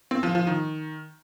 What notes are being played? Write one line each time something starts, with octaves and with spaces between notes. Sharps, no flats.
C4
F3
F3
D#3